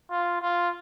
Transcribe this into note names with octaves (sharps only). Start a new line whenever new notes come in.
F4
F4